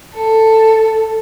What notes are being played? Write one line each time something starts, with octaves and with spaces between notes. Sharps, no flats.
A4